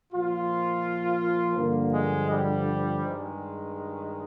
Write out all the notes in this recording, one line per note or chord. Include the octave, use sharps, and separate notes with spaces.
A#2 F3 F4
G2 D3 F3 A#3
G#3
G3
G2 D#3 G#3